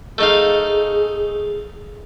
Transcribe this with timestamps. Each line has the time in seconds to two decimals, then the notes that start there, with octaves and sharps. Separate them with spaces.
0.18 A3 D#4 G#4 F5